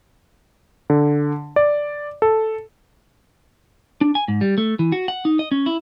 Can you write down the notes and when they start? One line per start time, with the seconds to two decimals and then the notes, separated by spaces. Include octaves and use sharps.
0.90 D3
1.56 D5
2.22 A4
4.01 D4
4.15 G#5
4.28 G#2
4.41 G3
4.58 A3
4.79 E3
4.92 F#4
5.08 F#5
5.25 D#4
5.39 D#5
5.52 C#4
5.66 E4